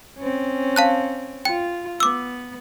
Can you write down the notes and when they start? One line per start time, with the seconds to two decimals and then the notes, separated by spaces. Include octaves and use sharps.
0.19 C4 C#4
0.76 F5 A5 F#6
1.45 F4 G5
2.00 B3 D6 E6